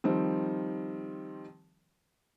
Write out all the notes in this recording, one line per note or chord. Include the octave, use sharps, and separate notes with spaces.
D#3 F3 G3 C4